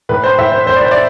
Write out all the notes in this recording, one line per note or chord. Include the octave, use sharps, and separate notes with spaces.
A2 B4
C5
A2 E5
C5
A2 C5
D5
C5
D5